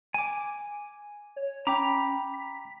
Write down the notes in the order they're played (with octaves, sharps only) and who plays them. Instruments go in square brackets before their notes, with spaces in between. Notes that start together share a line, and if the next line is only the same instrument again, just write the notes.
[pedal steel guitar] G#5 D6
[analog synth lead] C#5
[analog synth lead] C#4 [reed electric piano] G5 D6 [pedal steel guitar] A#5 B5
[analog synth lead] B6